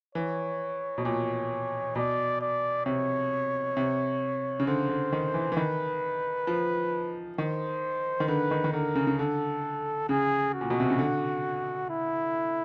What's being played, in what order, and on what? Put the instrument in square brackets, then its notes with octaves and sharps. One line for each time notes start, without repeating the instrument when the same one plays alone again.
[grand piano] E3 [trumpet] C#5
[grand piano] B2
[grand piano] A#2 [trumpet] C#5
[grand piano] B2 [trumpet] D5
[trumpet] D5
[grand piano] C3 [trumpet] C#5
[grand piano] C3
C#3
[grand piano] D3 [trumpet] C5
[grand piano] D3
D#3
E3
E3
[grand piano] D#3 [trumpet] B4
[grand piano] F3
[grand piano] D#3 [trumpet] C5
[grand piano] D#3
[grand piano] D3 [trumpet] B4
[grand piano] D#3
D#3
[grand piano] D3 [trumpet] A#4
[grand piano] C#3
C#3
[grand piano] D3 [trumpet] A4
[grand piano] C#3 [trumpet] G#4
[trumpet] F#4
[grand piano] A#2
B2
C3
C#3
D3
[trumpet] E4